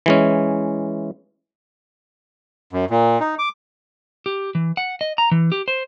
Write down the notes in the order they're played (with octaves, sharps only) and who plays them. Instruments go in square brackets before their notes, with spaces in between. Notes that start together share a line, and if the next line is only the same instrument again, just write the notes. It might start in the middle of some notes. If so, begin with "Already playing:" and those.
[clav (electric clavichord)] E3 G#3 C#4
[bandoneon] F#2
A#2
D#4
D6
[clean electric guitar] G4
E3
F#5
D#5
A#5
E3
G4
C5